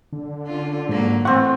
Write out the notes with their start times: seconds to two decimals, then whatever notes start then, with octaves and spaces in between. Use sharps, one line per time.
0.13 D3
0.46 C#4 F4
0.89 G#2 F#3 A#3
1.25 A2 E3 C4 F#5 C#6